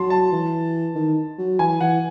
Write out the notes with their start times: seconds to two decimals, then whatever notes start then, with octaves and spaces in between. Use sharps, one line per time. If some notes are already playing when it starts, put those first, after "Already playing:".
Already playing: F#3 A5 C6
0.10 A5
0.32 E3
0.95 D#3
1.38 F#3
1.59 E3 G#5
1.81 E3 F#5